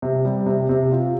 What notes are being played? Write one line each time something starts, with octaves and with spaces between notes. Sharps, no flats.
C3
G3
C3
C3
F4